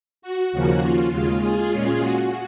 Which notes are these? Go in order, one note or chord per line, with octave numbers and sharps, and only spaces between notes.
F#4
D#2 C#3 F3 A#3 C#4
F4
D#2 C#3 G#3
F4 G#4
A#2 G#3 C#4
F#4